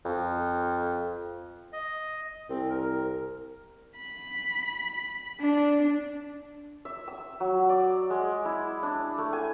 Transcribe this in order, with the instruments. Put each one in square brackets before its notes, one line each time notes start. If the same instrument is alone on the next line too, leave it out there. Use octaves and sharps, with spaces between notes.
[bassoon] F2
[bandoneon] D#5
[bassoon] C2 [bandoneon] C4
[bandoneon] A#4
[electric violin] B5
D4
[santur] E5
E6
F#3
D5
G#3
E4
D4
A3
G#5